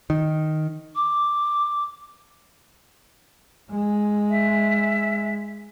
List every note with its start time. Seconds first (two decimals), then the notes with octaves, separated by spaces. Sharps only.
0.10 D#3
0.96 D6
3.70 G#3
4.30 E5